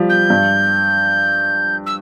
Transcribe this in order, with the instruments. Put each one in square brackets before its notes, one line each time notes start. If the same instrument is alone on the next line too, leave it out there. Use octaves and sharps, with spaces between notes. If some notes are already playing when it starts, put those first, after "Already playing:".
Already playing: [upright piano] F3 G3
[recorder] G6
[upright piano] G2
[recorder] E6